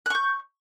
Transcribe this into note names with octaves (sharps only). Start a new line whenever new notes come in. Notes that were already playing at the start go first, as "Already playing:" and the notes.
C#6 F#6 G6